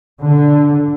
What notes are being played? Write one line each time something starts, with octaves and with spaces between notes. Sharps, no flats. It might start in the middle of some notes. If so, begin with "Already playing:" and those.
D3